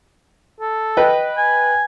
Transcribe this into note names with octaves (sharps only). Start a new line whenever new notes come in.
A4
B4 D#5 G5
G#5